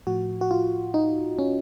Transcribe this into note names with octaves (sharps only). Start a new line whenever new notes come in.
A2 F3 F#4
F#4
F4
D#4
C#4